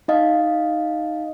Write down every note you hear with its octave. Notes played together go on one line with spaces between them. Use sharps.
D#4 D#5 F5